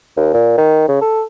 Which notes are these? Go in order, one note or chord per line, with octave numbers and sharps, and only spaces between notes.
D#2
A#2
D#3
C#3
A4